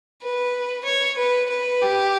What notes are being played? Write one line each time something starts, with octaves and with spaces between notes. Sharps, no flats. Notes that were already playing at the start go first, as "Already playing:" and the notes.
B4
C#5
B4
B4
G4